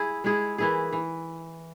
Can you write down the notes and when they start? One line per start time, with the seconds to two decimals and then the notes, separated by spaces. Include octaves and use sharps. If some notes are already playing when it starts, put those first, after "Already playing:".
Already playing: E4 G#4
0.24 G#3 E4 G#4
0.58 E3 A#3 E4 G#4
0.93 E3